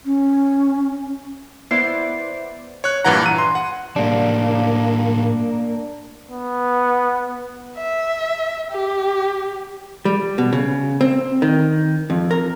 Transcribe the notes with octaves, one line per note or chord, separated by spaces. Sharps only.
C#4
B3 E4 C5 D5 C7
C#5 F#6
G2 A#2 E3 F#5 A#5
D#7
C6
F#5
A2 G3 A#3 D4
B3
E5
G4
G3
B2
C#3
C4
D#3
F2
A#4